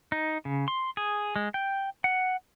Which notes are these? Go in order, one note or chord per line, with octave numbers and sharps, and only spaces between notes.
D#4
C#3
C6
G#4
G#3
G5
F#5